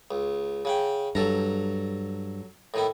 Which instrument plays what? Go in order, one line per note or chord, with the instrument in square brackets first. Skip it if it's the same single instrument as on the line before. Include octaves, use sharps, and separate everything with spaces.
[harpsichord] C#2
C#3 F#5 G5
[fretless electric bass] G2 [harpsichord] F#3 A4 A#5
[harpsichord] A2 D#3 E4